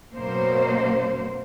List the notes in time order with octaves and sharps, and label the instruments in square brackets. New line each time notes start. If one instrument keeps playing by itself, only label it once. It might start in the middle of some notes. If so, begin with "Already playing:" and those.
[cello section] F#2 B2 A#3 C5